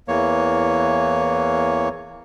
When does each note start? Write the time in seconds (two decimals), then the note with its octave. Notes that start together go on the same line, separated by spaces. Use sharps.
0.08 E2 E3 A#3 C#5